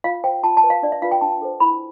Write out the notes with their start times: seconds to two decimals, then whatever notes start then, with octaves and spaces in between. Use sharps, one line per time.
0.04 F4 F5
0.24 C5 G5
0.43 F4 A5
0.57 A5
0.64 B4
0.70 F5
0.83 D4 D5
0.92 E5
1.02 F4 B4 F5
1.12 G5
1.21 D4 A5
1.42 A4 C5
1.60 E4 B5